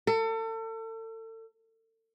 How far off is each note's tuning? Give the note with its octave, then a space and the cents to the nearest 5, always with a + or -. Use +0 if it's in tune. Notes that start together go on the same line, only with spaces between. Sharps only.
A4 +35